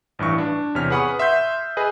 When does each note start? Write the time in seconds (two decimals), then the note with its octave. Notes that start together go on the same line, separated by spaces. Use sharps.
0.19 A1 G2 E3 C#6
0.38 D4
0.75 E2 C3 C#5 F6 B6
0.90 G#4 B4 F#5 B5 C#6 D#6
1.19 E5 C6 E6 G6
1.77 G#4 B4 D#5